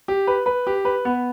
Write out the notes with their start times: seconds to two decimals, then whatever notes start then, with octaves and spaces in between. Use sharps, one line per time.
0.08 G4
0.27 B4
0.46 B4
0.67 G4
0.85 B4
1.05 B3